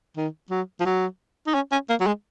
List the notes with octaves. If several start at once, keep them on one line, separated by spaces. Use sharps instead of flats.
D#3
F#3
F3
F#3
D#4
C#4
C#4
A#3
F#3
G#3